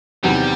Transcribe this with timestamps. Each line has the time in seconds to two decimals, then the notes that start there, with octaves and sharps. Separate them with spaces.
0.24 E2 C3 D#3 F#3 G3 B3